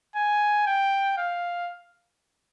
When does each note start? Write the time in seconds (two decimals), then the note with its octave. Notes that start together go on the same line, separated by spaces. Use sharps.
0.16 G#5
0.67 G5
1.18 F5